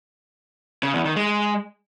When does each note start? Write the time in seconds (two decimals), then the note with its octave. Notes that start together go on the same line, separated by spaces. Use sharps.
0.83 C#3
0.94 E2
1.05 D#3
1.16 G#3